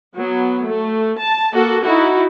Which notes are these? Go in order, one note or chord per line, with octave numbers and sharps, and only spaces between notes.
F#3 B3
A3
A5
A#3 F#4 A4
D#4 E4 F#4